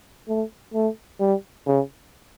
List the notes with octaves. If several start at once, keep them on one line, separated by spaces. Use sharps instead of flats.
A3
A3
G3
C#3